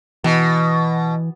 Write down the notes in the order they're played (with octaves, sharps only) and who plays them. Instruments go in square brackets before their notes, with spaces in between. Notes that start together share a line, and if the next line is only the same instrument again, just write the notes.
[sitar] B2 [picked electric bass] E3